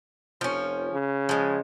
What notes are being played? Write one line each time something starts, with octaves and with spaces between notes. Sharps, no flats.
F1 F3 C#4
C#3
F3 G#3